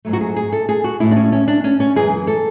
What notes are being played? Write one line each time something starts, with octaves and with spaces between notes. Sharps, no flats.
G#2 F#3 A3
F#4
G#4
G#4
A4
G#4
F#4
A2 G#3 E4
D4
C#4
C#4
D4
C#4
C#4
F#2 E3 G#3 G#4
A4